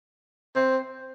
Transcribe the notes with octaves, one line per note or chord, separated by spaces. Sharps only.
C4